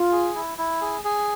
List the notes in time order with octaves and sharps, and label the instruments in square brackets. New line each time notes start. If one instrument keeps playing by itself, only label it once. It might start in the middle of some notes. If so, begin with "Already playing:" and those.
Already playing: [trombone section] F4
[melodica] G#4
E4
E4
G#4
G#4